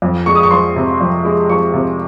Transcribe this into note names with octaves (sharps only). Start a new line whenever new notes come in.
F2
G#3 C#6
D#6
C#6
F3 C6
C3
F2
G#3
F3 C#6
C3